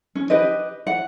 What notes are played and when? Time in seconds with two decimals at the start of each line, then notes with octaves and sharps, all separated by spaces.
0.15 C#4
0.30 G4 B4 D#5
0.87 F#5